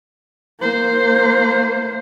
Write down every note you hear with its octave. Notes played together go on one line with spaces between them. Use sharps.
A#3 C5